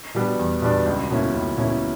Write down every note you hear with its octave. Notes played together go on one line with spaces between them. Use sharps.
B2 G3 B3 D4
E2
B2 G3 B3 D4
C#2
B2 A#3 C#4 E4
C#2
B2 A#3 C#4 E4